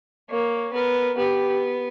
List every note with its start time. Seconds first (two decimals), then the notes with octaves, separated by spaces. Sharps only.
0.30 A#3 C#5
0.73 B3 A#4
1.17 B3 G4